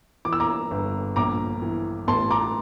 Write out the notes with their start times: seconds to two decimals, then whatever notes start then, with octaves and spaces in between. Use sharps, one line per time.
0.25 E3 D6
0.33 E6
0.40 A#5 D6
0.71 G1
1.16 A#1 A#5 D6
1.62 E3
2.07 A1 A5 C6
2.31 A#5 D6